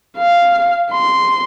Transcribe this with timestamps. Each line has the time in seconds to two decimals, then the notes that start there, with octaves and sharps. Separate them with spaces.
0.17 F5
0.92 C6